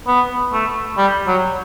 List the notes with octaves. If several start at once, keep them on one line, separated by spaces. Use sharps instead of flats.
B3
A3
G3
F#3